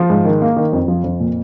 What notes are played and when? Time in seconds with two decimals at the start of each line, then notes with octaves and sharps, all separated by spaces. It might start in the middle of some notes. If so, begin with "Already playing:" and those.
Already playing: F3
0.10 G#2
0.25 D#3
0.42 A#3
0.56 D#3
0.73 F2
0.88 F3
1.04 F2
1.20 A#2